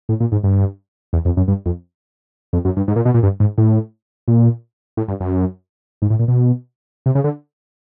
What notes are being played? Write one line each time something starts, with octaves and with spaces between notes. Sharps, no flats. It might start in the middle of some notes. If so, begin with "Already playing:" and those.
A2
A#2
G#2
G2
E2
F2
F#2
G2
F2
F2
F#2
G2
G#2
A#2
B2
A#2
G2
G#2
A2
A#2
A2
G2
F#2
G#2
A2
A#2
B2
C3
C#3
D3